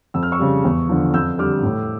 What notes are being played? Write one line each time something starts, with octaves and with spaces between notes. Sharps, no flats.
F2 E6
F6
C#6 E6
C#3 G3
E2
D3 F3
F2 E6 G6
D3 G3 D6 F6
A2